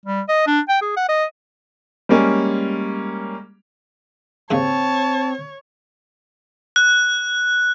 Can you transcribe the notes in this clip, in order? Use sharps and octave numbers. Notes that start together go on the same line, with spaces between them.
G3
D#5
D4
G5
G#4
F#5
D#5
G3 G#3 A#3 C#4
D#2 G#2 C#3 C4 C#5 A5
F#6